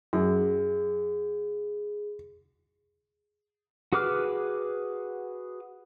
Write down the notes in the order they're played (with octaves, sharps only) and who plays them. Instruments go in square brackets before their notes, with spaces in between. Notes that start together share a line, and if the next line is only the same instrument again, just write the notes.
[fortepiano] F#2 [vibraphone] G#4
[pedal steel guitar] F#4 G#4 B4 D6 F6